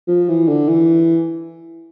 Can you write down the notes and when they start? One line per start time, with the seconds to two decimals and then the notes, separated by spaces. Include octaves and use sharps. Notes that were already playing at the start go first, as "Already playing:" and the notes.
0.08 F3
0.29 E3
0.48 D3
0.68 E3